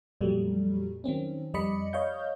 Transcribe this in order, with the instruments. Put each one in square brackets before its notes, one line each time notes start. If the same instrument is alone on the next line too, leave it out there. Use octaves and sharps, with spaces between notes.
[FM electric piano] F2 A#2 F#3 G3 A3
D#3 F#3 C4 C#4
F2 G3 D5 D#5 B5 C#7
C#5 D#5 F5 G6